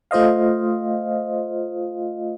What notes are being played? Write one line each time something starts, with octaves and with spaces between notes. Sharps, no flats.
A3 F4 C5 D#5 F5